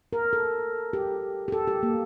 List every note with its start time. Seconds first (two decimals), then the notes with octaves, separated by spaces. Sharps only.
0.13 A#4
0.33 A4
0.93 G4
1.48 G4
1.52 A4
1.67 G4
1.83 A#3